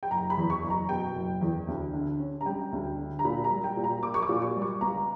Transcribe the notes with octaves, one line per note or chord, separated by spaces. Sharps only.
G5
F#1 A#5
B5
E2
C#6
F#1
A#5
B2 G5
F#1
E2
D2
D3
C#4
A#5
G3 G5
D2
D3
A#5
A#2 B5
A#5
G3
G5
A#2
A#5
A#3 D6
C#6
D6
A#2
C#6
G3
C#6
C#2 A#5